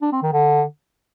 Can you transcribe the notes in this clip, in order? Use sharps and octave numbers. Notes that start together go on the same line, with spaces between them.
D4
C4
D#3
D3